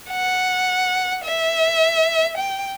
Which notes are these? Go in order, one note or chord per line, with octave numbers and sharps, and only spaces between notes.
F#5
E5
G5